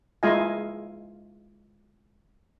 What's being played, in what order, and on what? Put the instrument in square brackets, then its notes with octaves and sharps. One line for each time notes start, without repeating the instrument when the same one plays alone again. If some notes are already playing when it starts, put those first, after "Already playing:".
[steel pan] G#3 E4 F4 D#5 F5 G#5